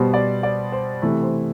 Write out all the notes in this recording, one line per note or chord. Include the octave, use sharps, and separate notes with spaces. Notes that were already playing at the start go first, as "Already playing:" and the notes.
Already playing: B2 G3 B3 C5
D5
D5
C5
C3 E3 A3
C5